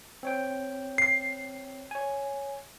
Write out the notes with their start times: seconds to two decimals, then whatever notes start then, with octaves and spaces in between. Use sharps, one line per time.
0.23 C4 C#5 G5
0.98 C7
1.91 C#5 G#5